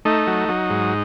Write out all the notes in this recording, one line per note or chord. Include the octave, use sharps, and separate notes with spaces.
A3 D#4
F#3
F#3
G#2